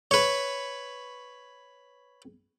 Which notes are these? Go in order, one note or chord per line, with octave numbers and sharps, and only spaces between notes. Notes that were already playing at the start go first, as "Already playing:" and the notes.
B4 C#5